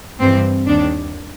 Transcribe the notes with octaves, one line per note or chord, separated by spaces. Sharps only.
G2 E3 C4
D#2 D#3 D4